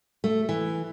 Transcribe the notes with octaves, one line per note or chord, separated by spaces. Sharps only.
A3
E3